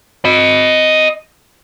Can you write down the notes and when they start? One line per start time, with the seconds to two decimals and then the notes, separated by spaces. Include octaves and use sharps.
0.25 D#5 B5